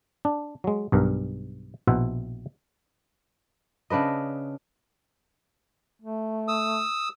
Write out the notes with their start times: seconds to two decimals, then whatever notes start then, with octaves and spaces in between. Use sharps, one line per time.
0.25 D4
0.64 F#3 G#3
0.92 B1 G2 A#4
1.87 A#1 B2 E4 C5 E5 F#5
3.90 C#3 D4 B4 D#5
6.02 A3
6.48 D#6 E6